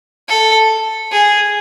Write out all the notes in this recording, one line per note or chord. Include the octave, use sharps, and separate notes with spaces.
A4
G#4